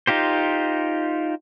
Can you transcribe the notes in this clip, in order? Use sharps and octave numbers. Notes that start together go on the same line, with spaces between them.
D#4 F4 G4 C5